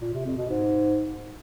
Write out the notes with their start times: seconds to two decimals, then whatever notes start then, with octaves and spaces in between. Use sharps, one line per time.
0.02 A#2
0.14 C3
0.25 F2
0.37 B2
0.49 G#2